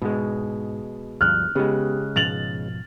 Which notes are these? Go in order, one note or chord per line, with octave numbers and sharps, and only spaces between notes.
G#2 B2 G#3
D2 G2 F3 F6 F#6
C#3 G#3 B3 G4
G#2 B2 F3 A6 F7 F#7